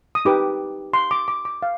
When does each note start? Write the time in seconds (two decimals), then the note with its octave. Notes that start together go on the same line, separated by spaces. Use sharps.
0.15 D#6
0.25 D#4 G4 B4 D6
0.94 C6
1.11 D6
1.28 D6
1.45 D6
1.62 F5